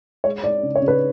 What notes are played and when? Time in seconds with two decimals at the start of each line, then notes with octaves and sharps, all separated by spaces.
0.24 G#3 C#5
0.43 G#3 D5
0.63 C#3
0.76 C#5
0.82 C#3
0.88 B4